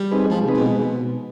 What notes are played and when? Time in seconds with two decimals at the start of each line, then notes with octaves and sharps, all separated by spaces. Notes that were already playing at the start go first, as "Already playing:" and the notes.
Already playing: G3
0.11 C4 D#4 G#4 B4
0.30 F3 G#3
0.42 C3
0.48 C4 D#4 G#4 B4
0.55 B2
0.66 G#3